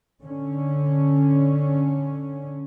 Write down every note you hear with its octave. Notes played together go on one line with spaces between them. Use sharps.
D3 C#4